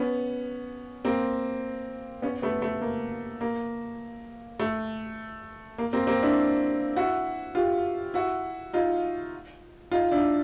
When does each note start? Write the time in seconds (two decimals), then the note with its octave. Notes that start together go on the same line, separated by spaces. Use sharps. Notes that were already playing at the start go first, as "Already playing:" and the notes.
Already playing: B3 C#4
1.05 A#3 C4
2.22 B3 C#4
2.42 A3 B3
2.62 A3
2.82 A#3
3.41 A#3
4.59 A3
5.78 A#3
5.93 A#3 C4
6.07 A#3 C4
6.23 D4 E4
6.96 E4 F#4
7.55 F4 G4
8.14 E4 F#4
8.73 D#4 F4
9.91 D#4 F4
10.11 D4 E4